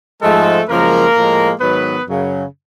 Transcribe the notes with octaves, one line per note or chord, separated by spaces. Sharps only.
G#2 F3 G#3 A3 A4
F#2 C#3 F3 G#3 A#3 A#4
A2 F3 G#3
G#2 D#3 F#3 B3 B4
F#2 C#3 F#3